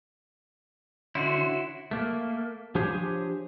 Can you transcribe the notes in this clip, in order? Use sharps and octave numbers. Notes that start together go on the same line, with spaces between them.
D3 C#4 E4 F#4 C6
A3 A#3
F3 D4 G4 G#4 C5 C#5